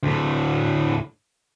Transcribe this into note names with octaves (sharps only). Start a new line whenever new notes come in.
D2 A2